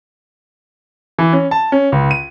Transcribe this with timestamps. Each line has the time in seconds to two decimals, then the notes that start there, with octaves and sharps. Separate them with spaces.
1.18 E3
1.33 C#4
1.51 A5
1.72 C#4
1.92 C#2
2.11 D#7